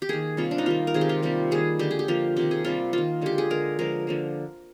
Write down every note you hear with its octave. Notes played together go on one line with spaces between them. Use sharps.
G4
D#3 A#3 G#4
C3 G3 A#3 F4
D4
D#4
D#3 G3 A#3 F4
A#4
C3 D#3 G#3 G#4
G4
F4
C3 G3 A#3 G4
D#3 G3 A#3 G#4
D3 G#3 G4
G#4
G4
D3 F3 A#3 F4
C3 D#3 A#3 G4
G#4
C3 G3 A#3 F4
D#3 A#3 F4
D3 G#3 G4
G#4
D3 G#3 A#4
D3 F3 G#3 A#4
D3 F3 A#3